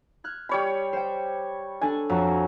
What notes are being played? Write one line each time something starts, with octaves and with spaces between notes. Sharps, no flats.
F6 F#6 G#6
G3 C#5 B5
C5 G5
D4 A4 G#5
F2 F#3